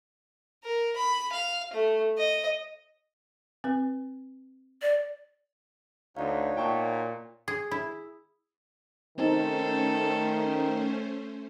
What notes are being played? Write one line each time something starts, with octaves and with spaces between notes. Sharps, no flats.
A#4
B5
F5
A3
D#5
C4 B4
D5
D2 D#4 F#4 C#5 D5 F5
A#2 G5 A5 C#6
G#4
E4
D#3 A3 C4 C#4 D#4 A4 C5